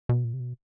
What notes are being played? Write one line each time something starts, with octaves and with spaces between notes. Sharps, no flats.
B2
A#2
C3
B2